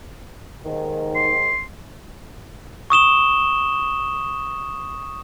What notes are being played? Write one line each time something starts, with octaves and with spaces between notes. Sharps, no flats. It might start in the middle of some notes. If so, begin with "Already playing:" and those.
D#2 G#2 D#3
C6
C#6 D#6 E7 G7